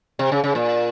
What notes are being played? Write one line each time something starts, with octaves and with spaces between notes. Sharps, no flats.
C3
C#3
C#3
A#2